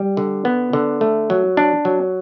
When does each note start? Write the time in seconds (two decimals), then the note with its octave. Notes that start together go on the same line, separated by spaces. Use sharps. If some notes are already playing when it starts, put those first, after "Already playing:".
Already playing: G3
0.17 D3
0.45 B3
0.73 D3
1.01 A3
1.30 F#3
1.57 D4
1.85 F#3